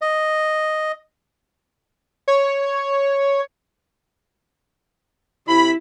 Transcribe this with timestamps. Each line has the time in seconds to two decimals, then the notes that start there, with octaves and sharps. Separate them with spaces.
0.02 D#5
2.28 C#5
5.47 C3 E4 B5